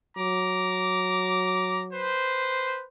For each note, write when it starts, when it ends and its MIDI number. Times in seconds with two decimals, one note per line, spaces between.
0.18 2.15 54
0.18 1.84 82
0.18 1.84 86
1.92 2.84 71
1.92 2.84 72